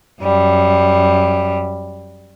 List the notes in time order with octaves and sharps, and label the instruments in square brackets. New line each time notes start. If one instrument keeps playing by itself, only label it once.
[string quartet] F#2 G3